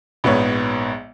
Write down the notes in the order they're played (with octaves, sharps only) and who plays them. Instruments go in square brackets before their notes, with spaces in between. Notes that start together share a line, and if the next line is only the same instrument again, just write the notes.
[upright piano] A#1 G#2 B3 C#5